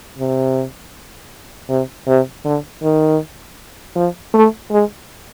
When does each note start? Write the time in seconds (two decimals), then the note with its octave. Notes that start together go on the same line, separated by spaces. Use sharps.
0.19 C3
1.69 C3
2.07 C3
2.45 D3
2.83 D#3
3.95 F3
4.34 A3
4.71 G#3